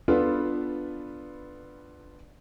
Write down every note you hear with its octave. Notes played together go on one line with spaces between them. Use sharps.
B3 D4 F4 A4 B4